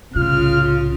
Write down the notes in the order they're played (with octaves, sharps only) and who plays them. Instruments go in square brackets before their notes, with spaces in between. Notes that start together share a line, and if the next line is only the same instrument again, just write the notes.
[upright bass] C2 A2 [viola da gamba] C#3 [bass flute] F4 [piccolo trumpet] F6